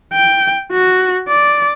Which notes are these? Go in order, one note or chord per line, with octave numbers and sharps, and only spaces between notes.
G5
F#4
D5